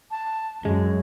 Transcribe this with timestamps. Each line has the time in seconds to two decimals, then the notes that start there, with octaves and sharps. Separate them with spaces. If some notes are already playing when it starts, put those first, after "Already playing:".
0.11 A5
0.65 F#2 G#3